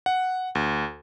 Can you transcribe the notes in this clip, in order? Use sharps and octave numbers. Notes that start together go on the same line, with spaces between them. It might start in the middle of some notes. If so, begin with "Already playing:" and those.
F#5
D2